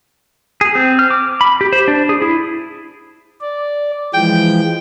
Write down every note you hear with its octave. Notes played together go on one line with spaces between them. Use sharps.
G#4
C4
F6
D6
B5
G4
C5
D4
G#4
E4
D5
E3 F3 G#3 G5